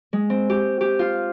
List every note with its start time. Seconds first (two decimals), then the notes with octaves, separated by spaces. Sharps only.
0.13 G#3
0.30 C4
0.50 G4
0.81 G4
0.99 F4